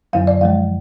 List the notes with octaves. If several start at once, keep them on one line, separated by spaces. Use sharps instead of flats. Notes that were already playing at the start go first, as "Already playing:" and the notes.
F#2 D3 F#3 F5
D5
F#2 F3 G#3 F5